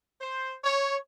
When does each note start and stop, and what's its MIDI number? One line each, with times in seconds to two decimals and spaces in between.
0.20 0.53 72
0.64 0.95 73